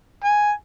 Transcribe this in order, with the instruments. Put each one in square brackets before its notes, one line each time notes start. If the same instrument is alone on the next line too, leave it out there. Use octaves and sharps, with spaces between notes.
[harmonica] G#5